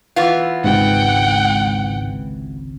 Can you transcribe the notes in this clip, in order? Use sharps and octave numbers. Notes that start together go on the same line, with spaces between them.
E3 B3 F4
G#1 C#2 G#2 C3 F#5 G5